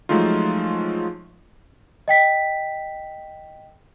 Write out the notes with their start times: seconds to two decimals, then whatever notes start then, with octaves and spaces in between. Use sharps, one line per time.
0.09 F3 F#3 G#3 A3 D#4 F4
2.08 D#5 G5 B6